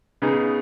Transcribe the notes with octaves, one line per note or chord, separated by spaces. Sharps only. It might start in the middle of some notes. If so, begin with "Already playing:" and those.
C#3 B3 D#4 G#4